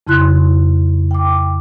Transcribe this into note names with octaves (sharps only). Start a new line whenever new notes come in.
F2 C#3 E4 C6 F#6
G5 D6